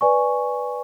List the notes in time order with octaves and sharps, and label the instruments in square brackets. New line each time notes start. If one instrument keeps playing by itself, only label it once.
[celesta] B4 D5 G#5 C#6